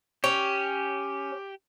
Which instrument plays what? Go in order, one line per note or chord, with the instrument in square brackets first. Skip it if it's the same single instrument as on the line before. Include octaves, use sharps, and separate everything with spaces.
[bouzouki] C#4 [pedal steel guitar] G4